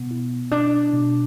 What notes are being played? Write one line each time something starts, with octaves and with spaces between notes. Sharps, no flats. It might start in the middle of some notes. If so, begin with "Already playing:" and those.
Already playing: B2 B3
E4
B2 D4
B2